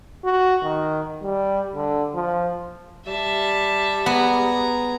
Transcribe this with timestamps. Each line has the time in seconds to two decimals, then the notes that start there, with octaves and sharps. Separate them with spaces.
0.24 F#4
0.63 D#3
1.22 G3
1.75 D3
2.14 F3
3.07 G3 E5 A5
4.06 B3 G#4 A#5